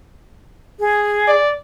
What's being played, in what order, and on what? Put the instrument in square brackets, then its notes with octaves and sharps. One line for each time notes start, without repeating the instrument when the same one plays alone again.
[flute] G#4
[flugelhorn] D5